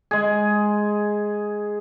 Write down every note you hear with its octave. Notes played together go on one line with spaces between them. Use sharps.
G#3 G#4